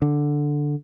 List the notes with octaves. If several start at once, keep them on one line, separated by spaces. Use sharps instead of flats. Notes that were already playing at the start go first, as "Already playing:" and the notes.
D3